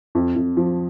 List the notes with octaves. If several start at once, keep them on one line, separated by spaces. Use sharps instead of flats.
F2
F2
F3